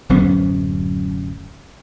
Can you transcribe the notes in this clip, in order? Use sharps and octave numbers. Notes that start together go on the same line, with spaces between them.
D1 F#2 B3 C#4